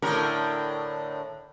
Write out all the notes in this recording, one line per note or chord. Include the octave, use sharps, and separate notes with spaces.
A2 D3 A#4